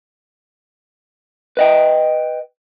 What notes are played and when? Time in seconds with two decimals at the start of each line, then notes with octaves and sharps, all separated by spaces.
1.57 B4 D#5 G5